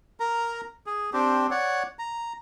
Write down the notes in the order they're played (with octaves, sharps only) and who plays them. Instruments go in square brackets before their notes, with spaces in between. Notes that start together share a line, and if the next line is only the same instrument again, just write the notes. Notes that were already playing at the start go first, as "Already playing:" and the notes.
[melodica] A#4 A#5
G#4
C4 D4 G4
C#5 D5 F#5
A#5